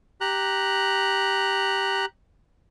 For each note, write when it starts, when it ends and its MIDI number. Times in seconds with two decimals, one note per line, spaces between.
0.21 2.06 67
0.21 2.06 82
0.21 2.06 90